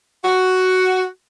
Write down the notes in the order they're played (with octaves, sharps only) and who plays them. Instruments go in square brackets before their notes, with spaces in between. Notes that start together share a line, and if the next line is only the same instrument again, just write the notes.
[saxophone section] F#4